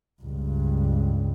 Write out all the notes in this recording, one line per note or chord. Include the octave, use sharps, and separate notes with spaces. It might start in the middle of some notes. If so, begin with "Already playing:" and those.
C#2 G2